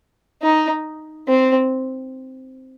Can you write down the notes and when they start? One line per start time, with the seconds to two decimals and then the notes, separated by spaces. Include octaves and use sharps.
0.42 D#4
1.28 C4